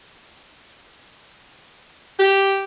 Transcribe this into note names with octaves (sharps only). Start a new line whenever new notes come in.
G4